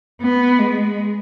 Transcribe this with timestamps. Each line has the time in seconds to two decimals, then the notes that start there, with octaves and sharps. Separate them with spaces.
0.21 B3
0.59 G#3